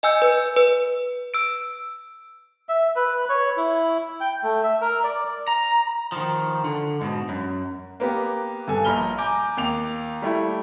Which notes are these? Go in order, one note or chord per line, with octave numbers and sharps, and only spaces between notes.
D#5 G#5 E6 G6
B4
B4
E6 D7
E5
B4
C#5
E4
G5
A3
E5
A#4
D5
A#5
D#3 F3
D3
G#2 B2
F#2
A#3 B3 G4
G2 A4 G#5
A#1 A#5 B5 F6 G7
G#5 A#5 D6 G6
D#2 D6 F7
G3 A3 E4